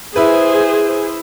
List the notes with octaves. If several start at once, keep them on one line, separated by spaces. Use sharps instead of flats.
E4 G#4 B4 C5